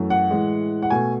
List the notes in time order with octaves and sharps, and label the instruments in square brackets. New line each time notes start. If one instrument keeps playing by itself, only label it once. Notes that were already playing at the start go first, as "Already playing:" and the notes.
Already playing: [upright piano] F#2 E3 A3
F#5
A2 E3 G#3
F#5
B2 A3 G#5